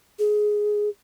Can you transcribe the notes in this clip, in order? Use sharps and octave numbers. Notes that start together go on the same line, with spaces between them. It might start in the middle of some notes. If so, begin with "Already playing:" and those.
G#4